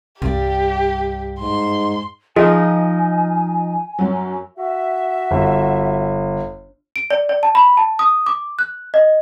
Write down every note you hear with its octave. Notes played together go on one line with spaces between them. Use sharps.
C2 G2 G4 D5
G#2 C6
F3 D#4 F4 G#4 D#5 G#5
F#2 F#3
F#4 E5
G1
D7
D5
D5
A5
B5
A5
D#6
D6
F#6
D#5